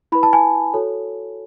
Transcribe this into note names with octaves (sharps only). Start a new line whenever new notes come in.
E4 B4 B5
A5
G#5
F#4 A4 C#5